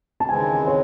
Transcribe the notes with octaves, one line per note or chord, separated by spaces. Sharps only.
A5
D#2 C#3 E3 G#3 C4 G#5
C#5